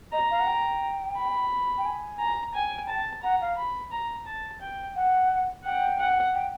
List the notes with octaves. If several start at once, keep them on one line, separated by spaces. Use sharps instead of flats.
D#5 A#5
F5
F#5
G5
B5
G5
G#5
A#5
G5 G#5
A5
F#5 A#5
F5
B5
A#5
A5
G5
F#5
F#5 G5
F#5
G5